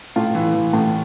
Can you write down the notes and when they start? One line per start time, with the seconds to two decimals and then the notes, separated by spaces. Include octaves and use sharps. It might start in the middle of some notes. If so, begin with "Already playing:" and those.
0.16 A2 F4
0.35 E3
0.55 E3
0.73 A2